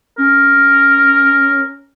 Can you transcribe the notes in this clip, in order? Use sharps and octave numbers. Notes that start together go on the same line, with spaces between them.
C#4 A#4